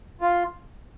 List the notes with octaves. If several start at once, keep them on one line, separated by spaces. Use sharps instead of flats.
F4